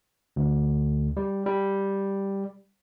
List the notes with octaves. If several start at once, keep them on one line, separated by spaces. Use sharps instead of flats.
D2
G3
G3